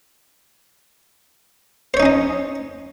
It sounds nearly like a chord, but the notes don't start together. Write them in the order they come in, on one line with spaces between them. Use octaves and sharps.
C5 C#5 D#4 C#4 D#5